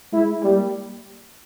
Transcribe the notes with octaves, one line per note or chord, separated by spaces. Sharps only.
G#3 E4
G3 A#3